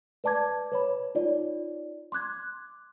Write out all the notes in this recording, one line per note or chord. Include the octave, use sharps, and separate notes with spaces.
B4 D5 A5 D6 G#6
B4 C#5 B5
D#4 F4 C#5 D5
C6 D6 F#6 G#6